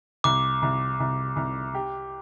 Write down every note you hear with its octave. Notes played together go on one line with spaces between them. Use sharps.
C2 D6
C2
C2
C2
G4